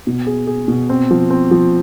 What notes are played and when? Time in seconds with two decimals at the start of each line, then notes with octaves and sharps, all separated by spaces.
0.07 B2
0.27 G#4
0.47 G#4
0.68 B2
0.90 C4
1.11 F3
1.30 C4
1.51 F3